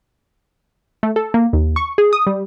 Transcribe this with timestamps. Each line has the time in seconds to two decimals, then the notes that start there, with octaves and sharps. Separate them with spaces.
1.03 A3
1.16 A4
1.34 A#3
1.53 D#2
1.76 C#6
1.98 G#4
2.13 D#6
2.27 G3